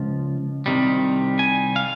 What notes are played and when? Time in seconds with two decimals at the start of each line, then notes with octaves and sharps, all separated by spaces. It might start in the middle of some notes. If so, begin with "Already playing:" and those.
Already playing: C#2 F3
0.66 C2 C3 D#3 G3
1.39 G#5
1.76 F5